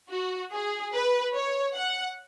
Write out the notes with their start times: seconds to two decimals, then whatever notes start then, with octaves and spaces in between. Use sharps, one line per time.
0.11 F#4
0.52 G#4
0.93 B4
1.34 C#5
1.75 F#5